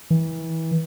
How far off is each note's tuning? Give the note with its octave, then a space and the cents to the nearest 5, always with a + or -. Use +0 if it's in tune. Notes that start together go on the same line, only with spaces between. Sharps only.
E3 -25